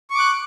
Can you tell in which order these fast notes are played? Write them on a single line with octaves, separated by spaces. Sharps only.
C#6 D6 F#6